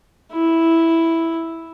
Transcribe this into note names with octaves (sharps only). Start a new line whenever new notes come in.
E4